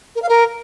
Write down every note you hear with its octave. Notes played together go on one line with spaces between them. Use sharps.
A#4
F5
A#4